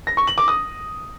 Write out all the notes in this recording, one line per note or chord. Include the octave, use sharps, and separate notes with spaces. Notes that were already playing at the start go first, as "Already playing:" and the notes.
A#6
C#6
F#7
D6
D#6